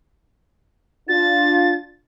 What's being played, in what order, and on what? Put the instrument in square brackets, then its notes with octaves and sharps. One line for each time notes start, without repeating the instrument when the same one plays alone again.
[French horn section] D4 F4 [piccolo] A6